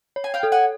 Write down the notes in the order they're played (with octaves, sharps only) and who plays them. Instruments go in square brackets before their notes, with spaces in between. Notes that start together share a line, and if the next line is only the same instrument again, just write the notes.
[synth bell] C#5
[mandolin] G#5
F5 G5
[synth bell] A4
[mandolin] F#5 G#5